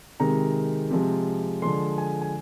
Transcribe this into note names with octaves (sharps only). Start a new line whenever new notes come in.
C3 D#3 G#3 A#5
C3 F3 G#3
D3 F3 G#3 C6
G#5
G#5